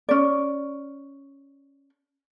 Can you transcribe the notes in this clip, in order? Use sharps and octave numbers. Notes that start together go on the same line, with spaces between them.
C#4 D5